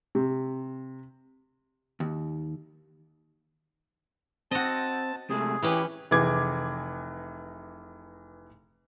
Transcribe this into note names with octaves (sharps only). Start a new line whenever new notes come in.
C3
D#2
C4 F#4 D#5 A5
C3 G#3 A3 G#4
E3 C#4 E4 G4 B4
F1 E3 G#4 D6 G#6